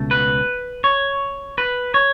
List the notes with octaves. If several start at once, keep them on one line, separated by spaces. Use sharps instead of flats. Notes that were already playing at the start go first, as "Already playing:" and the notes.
Already playing: C#2 B2 A3
B4
C#5
B4
C#5